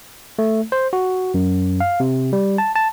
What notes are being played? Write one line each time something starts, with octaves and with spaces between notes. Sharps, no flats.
A3
C5
F#4
F#2
F5
C3
G3
A5
A5